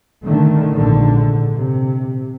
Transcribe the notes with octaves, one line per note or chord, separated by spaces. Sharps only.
D3 D#3 A3
A#1 G#2 D3
C3